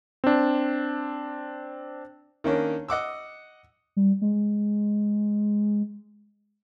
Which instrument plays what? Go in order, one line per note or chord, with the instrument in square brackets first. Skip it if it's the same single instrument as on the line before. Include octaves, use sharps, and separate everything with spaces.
[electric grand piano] C4 D4
[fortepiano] D#3 A#3 C#4 D4
D#5 F#5 D6 E6
[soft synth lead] G3
G#3